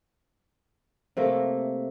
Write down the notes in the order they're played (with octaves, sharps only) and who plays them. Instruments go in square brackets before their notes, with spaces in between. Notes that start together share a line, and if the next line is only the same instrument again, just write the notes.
[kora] C3 A3 A#3